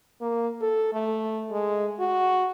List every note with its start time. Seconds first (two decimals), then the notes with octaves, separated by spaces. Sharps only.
0.21 A#3
0.62 A4
0.93 A3
1.51 G#3
1.99 F#4